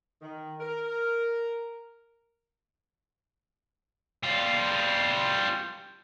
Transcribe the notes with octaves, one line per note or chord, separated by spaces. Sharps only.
D#3
A#4
G3 F4